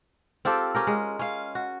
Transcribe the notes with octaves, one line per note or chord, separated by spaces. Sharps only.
C4 F4 G4 A4
C#4 G4 A#4
G#3
C#4 F5
F#4